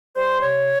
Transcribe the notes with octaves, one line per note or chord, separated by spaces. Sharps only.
G3 C5
C3 C#5